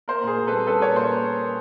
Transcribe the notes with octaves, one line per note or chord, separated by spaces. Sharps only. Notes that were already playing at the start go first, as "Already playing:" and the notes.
A#3 A#4 C5
A#2 G#4 A#4
A#2
G3 A4 B4
C#4 A4 B4
A#2 B4 C#5
A#2 A#4 C5